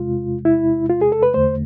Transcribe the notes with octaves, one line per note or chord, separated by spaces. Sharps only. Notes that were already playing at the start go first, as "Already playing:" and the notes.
Already playing: E2 C3 G#3 F4
E4
F4
G#4
A4
B4
E2 D3 A3 C5